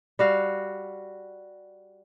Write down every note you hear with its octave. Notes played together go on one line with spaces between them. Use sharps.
G3 F#4 F5